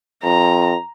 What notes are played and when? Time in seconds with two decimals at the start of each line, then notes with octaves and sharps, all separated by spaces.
0.23 F2 A#5